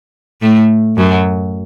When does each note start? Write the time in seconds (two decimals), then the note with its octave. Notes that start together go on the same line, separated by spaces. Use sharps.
0.42 A2 A3
0.97 F#2 F#3